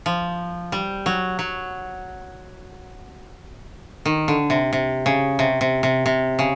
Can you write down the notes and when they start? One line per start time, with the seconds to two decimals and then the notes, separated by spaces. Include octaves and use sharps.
0.06 F3
0.72 G3
1.06 F#3
1.39 F#3
4.06 D#3
4.28 D3
4.50 C3
4.73 C3
5.06 C#3
5.39 C3
5.61 C3
5.83 C3
6.06 C3
6.39 C#3